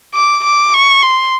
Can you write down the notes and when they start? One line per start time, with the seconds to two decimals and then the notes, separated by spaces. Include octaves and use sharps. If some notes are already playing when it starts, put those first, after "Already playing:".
0.14 D6
0.44 D6
0.74 C#6
1.03 C6